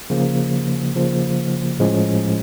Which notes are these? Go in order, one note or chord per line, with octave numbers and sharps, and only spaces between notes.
C#3 F3 A#3
C#3 F3 A#3
A2 F3 G#3 C#4